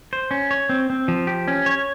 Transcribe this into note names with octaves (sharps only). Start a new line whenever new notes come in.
C5
C#4
C#5
C4
C4
F3
G4
C#4
C#5